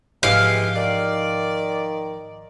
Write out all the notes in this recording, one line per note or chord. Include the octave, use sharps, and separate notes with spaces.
D2 G#2 E3 F3 G#3 G4 F5
D#3 D5